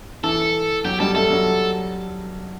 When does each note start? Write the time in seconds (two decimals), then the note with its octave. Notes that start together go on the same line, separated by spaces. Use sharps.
0.24 E3 A4
0.85 F#3 G4
1.00 G3 A4
1.15 A3 A4
1.30 F#3